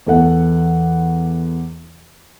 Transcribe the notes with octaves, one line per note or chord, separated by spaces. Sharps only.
E2 A4 F#5